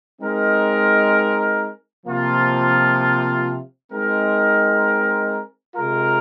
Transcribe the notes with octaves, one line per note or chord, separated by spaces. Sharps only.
G#3 C4 D#4 A#4
C3 F3 A#3 F4
G#3 C4 D#4 A#4
C3 G#3 F4 A#4